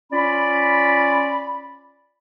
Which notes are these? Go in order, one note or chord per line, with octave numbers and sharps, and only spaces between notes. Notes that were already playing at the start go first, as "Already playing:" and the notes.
C#4 F4 D5 B5